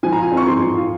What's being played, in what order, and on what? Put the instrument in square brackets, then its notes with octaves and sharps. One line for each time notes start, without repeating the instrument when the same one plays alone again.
[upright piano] F3 G#5
A#5
F4
G#5
C4
C#6
F3 C6
F3
F4